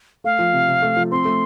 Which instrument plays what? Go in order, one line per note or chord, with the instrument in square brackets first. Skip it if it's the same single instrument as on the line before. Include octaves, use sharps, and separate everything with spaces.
[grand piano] A3 [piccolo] F5
[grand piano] F3
C3
C3
A3
F3
[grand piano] C4 [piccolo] C6
[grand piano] A3